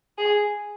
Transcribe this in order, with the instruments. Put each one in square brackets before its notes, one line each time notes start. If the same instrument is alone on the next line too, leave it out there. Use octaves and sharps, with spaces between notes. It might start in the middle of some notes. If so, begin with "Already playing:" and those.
[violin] G#4